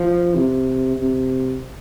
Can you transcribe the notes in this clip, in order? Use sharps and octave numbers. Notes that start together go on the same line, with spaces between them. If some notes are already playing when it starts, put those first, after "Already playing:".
Already playing: F3
C3
C3